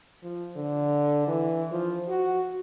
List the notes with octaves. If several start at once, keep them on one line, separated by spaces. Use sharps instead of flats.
F3
D3
E3
F3
F#4